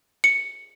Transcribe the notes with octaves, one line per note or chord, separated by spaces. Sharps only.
C#7